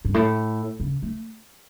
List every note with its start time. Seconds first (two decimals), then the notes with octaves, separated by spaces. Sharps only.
0.05 G2
0.14 A2
0.80 C#3
1.03 A3